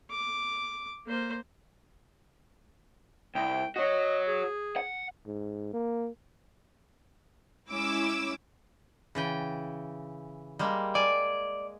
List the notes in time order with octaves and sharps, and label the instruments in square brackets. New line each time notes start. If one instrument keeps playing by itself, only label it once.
[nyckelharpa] D6
A#3 C5
[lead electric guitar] C2 [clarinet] G5
[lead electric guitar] F#4 C#5 [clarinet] D#5
[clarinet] G#4
[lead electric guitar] F#5
[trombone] G#2
A#3
[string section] G#3 C#4 E4 D6 E6
[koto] C#3 E3 G5
G3 G#3 A#3
[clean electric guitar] D5 [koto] G#5